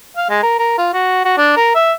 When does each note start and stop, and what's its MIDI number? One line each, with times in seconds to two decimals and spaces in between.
0.17 0.28 77
0.30 0.39 56
0.43 0.58 70
0.59 0.76 70
0.78 0.91 65
0.94 1.25 66
1.25 1.34 66
1.38 1.54 62
1.56 1.74 70
1.75 1.92 76